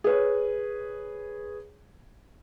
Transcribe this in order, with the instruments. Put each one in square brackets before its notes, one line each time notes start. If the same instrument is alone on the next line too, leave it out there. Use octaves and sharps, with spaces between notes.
[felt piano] G#4 B4 C#5